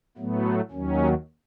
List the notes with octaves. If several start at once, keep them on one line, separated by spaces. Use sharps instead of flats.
A2 F#3 A3 B3
D#2 D#3 F#3 C#4